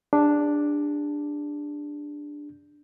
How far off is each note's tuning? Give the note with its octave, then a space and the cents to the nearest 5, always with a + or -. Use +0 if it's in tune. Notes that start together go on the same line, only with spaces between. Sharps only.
D4 +0 G#4 -45